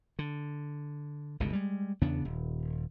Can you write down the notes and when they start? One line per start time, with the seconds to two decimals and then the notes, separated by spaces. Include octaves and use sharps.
0.19 D3
1.40 G1 C#2 B2 D3
1.53 G3 G#3
2.02 E2 C#3 B3 D4
2.25 D#1